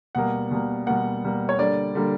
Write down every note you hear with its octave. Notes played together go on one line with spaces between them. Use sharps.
B2 G3 A#3 F#5
B2 G3 A#3
B2 G3 A#3 F#5
B2 G3 A#3
C#5
D3 G3 A#3 D5
D3 G3 A#3